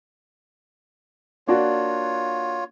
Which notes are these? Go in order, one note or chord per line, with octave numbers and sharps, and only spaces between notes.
A#3 D4 F4 F#4 C#5